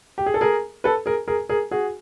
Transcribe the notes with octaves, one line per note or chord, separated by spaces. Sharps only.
G4
G#4
A4
G#4 A#4
A4 B4
G#4 A#4
G#4 A#4
G#4 A#4
F#4 G#4